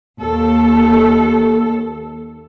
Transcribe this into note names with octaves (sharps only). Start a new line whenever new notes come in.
D#2 A4